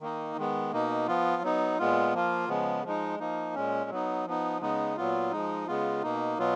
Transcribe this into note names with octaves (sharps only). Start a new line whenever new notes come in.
D#3 A#3 D#4
D#3 G#3 B3
B2 A#3 D#4
F3 B3 F4
F#3 B3 D#4
A#2 G#3 B3 F4
F3 A#3 F4
C#3 F3 G#3 B3
F3 G#3 D#4
F3 A#3 D#4
A#2 G#3 C#4
F#3 B3 D#4
F3 B3 D#4
C#3 G#3 B3 D#4
A#2 F#3 B3 F4
F3 G#3 D#4
C#3 G#3 B3 F4
B2 A#3 D#4
B2 F#3 B3 F4